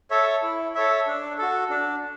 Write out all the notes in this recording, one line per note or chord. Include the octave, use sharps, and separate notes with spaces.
A4 C#5 E5
E4
A4 C#5 E5
D4
F#4 A4
D4